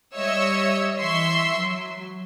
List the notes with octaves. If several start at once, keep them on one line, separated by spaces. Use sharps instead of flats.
G3 C#5 D#5 E5 E6
E3 E5 C6 C#6 E6 C7
F#3